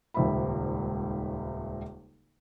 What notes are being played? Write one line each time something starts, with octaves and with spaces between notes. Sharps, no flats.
D#1 G#1 C#2 C5 E5 B5